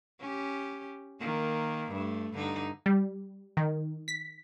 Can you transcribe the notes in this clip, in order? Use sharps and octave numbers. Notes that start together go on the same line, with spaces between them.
C#4 G4
D#3 A#3
G2 A3
G2 D3 D#4
G3
D#3
B6